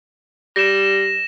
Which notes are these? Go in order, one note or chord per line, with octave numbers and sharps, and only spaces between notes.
G3 A#6 E7